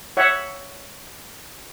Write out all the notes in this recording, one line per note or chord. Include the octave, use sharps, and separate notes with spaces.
C#5 E5 F#5